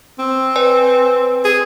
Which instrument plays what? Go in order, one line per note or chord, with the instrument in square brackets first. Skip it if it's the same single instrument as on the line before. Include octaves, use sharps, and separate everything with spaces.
[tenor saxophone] C4
[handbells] B4 D5 G#5
[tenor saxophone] G#4